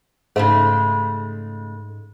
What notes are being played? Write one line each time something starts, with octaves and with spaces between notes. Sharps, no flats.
G#2 C#3 G#3 A3